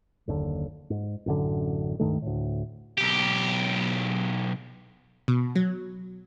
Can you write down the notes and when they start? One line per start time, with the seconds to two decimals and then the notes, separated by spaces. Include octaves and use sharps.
0.27 F#1 D#2 A2 D3
0.90 G#2
1.26 A1 F#2 D3
1.99 C#2 G2 D#3 A3
2.22 D2 A2
2.98 B1 G4
5.28 B2
5.56 F#3